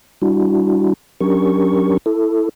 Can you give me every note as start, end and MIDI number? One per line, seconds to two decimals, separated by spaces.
0.22 0.93 55
0.22 0.93 62
0.22 0.93 64
0.22 0.93 66
1.21 1.97 54
1.21 1.97 61
1.21 1.97 62
1.21 1.97 67
1.21 1.97 70
1.21 1.97 85
2.06 2.49 64
2.06 2.49 69